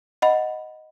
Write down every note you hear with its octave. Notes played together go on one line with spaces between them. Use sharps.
D#5 F#5 B5